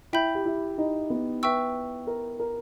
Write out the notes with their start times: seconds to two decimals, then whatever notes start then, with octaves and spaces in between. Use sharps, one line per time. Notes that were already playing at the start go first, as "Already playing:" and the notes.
0.13 E4 E5 G5 B5 G6
0.35 G4
0.45 E4
0.78 D#4
1.10 B3
1.43 B4 E5 G5 C#6 E6
2.07 A#4
2.40 A#4